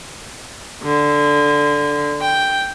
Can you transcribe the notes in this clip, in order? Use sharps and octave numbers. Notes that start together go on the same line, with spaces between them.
D3
G5